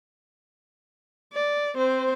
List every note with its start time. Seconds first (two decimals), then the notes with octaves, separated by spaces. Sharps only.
1.33 D5
1.75 C4 C5